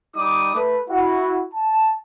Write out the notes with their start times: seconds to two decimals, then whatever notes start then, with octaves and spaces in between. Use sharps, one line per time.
0.15 G3 D#4 D6 D#6
0.55 A3 B4
0.90 E4 F#4
1.52 A5